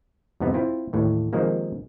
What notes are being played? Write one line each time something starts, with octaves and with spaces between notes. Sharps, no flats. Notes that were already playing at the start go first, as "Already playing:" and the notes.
F2 G#2 C3 B3 D#4
C4 E4 F4
D#2 A2 E3
C3 D#3 F3 G#3 A#3